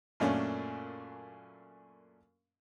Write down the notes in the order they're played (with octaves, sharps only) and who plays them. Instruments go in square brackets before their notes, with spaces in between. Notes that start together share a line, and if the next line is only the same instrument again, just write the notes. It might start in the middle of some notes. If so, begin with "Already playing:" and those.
[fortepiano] F#2 A#2 A3 C#4 D4